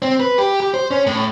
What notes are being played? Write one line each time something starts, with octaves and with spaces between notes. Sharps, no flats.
C4
B4
G4
G4
C5
C#4
A2